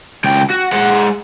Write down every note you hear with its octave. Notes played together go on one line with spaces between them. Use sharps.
C#2 G5
F#4
G#3 F#5